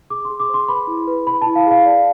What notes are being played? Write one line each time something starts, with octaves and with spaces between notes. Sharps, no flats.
G#4 D6
C6
G#4
D6
C5
C6
B4 B5
E4
B4
B4 B5
E4 A5
F5
G#4 F5
D5